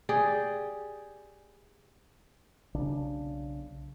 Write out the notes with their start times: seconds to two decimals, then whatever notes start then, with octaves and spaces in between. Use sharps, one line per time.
0.09 G4 G#4 D5
2.74 B1 C#3 D4